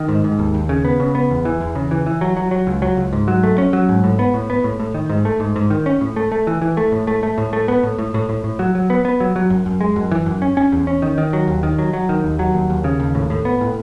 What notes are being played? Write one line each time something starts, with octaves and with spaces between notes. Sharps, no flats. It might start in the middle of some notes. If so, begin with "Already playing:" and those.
Already playing: D#3
G#2
G#2
D#2
D#2
C#3
B3
C#3
B3
E2
E3
E2
C#3
E3
E3
F#3
F#3
F#3
C#2
F#3
C#2
G#2
F#3
A3
C#4
F#3
G#2
A2
B3
A2
B3
A2
A2
D#3
G#2
A3
G#2
G#2
D#3
C#4
A2
A3
A3
E3
E3
A3
A2
A3
A3
A2
A3
B3
A2
A2
A2
A2
A2
F#3
F#3
B3
B3
F#3
F#3
F#2
F#2
G#3
F#2
E3
F#2
C#4
C#4
E2
C#4
D#3
D#3
F#3
D#2
D#3
F#3
F#3
D#3
D#2
F#3
D#2
D#2
C#3
D#2
A2
A2
B3
A2